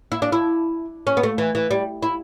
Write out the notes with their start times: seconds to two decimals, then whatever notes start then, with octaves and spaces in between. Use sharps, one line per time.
0.12 E4
0.22 D4
0.32 E4
1.07 C#4
1.17 B3
1.23 A3
1.38 E3
1.55 E3
1.71 G3
2.02 E4